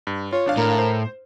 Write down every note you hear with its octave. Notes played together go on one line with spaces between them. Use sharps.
G2
F4 C#5
G#1 D4 F5
A2 A#4
C5